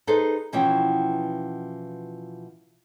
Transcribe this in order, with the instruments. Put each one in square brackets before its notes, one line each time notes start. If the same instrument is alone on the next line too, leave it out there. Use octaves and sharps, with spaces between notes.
[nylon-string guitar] D#4 G#4 A4 B4 C5
B2 E3 F3 B3 C#4 G5